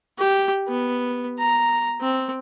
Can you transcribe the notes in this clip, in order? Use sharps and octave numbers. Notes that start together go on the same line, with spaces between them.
G4
B3
A#5
C4